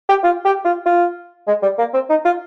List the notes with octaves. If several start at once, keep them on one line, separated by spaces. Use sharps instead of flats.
G4
F4
G4
F4
F4
G#3
G3
A#3
C4
D#4
F4